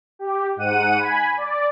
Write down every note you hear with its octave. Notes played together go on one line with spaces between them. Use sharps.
G4
G#2 F#5 D#7
G#5 B5
D5